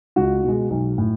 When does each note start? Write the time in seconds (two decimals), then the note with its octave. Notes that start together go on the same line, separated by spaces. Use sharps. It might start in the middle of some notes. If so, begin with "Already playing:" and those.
0.16 C#2 F#4
0.43 B2
0.48 G#3
0.70 B1
0.98 A2